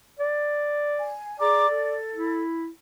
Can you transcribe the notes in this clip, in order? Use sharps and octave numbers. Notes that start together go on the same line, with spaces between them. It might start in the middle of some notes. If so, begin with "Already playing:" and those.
D5
G#5
G#4 D5 A#5 D6
A4
E4